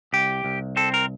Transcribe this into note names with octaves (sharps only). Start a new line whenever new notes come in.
C2 G4
C2
C4 A4
A#4